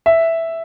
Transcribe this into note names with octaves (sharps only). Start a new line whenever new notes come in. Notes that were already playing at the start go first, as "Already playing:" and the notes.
E5